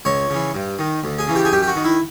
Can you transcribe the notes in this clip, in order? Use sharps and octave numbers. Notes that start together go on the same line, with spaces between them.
C#2 C#5
C#3 E3
G2
D#3
D2
G#4
C#3 E3
G4
G#4
F#2 G4
G4
F#4
D#3
E4